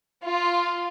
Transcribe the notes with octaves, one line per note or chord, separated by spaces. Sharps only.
F4